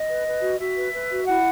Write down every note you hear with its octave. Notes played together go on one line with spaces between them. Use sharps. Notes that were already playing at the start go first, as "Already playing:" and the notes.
Already playing: D#5
B4
B4
F#4
F#4 E5
B4
B4
F#4
E4 F#5